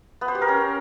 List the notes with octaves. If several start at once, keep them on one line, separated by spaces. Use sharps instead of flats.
B3
C5
G4
A#4
C#4